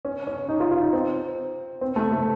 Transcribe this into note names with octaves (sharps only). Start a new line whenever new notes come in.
C#4
C#4
D#4
F4
F4
D#4
C4
C4
A3
A3